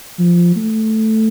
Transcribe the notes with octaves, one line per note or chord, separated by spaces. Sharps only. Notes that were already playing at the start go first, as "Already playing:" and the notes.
F3
A3